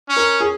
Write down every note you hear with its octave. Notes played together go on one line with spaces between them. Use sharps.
C#4
A#4
G#4